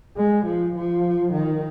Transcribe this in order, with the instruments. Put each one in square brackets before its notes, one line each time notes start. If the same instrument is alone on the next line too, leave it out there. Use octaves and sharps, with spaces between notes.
[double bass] G#3
F3
F3
D#3